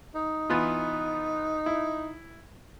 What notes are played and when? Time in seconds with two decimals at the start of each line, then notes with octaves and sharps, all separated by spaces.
0.15 D#4
0.50 E3 B3 F4
1.66 E4